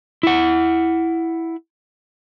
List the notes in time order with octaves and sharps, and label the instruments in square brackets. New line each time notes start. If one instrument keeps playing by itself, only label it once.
[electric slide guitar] E4 F#5